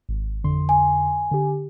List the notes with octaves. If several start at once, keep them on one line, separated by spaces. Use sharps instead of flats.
G#1
F2 D3 C6
G#5
D3 G4